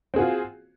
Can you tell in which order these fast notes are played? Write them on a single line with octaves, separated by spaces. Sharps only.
C4 G#4 F#4 F4